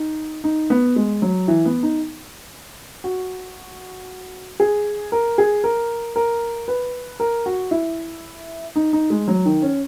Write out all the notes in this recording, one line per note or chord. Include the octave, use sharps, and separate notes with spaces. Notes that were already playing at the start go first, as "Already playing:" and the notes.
Already playing: D#4
D#4
B3
G#3
F#3
E3
B3
D#4
F#4
G#4
A#4
G#4
A#4
A#4
B4
A#4
F#4
E4
D#4
D#4
G#3
F#3
D#3
C#4